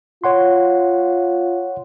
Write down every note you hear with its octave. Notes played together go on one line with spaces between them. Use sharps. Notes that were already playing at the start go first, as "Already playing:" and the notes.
F4 C#5 F#5 C6